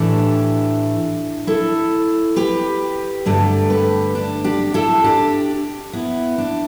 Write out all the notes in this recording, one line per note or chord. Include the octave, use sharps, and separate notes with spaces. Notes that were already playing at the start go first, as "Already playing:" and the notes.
Already playing: A2 E3 A3 D4 G4
E4 A4
G4 B4
G2 D3 A3 A4 D5
G4 B4
D4
D4 G4
E4 A4
D4 G4
B3 E4
D4